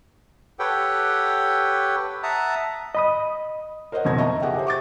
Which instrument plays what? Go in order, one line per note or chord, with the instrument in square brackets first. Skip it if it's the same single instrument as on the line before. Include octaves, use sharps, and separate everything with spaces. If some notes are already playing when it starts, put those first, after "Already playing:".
[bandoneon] G4 A4 B4 C#5 F#5 G5
E5 F#5 A5 A#5 D#6
[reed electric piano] D#5 B5 D#6
[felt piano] A#4 C5 C#5 D#5 F#5
F#1 F2 B2 G#6 A#6
D#5 E5 A5 A#5 C#6
G4 G#4 E5 F#5 G5
G4 G#4 C5
C#6 D6 A6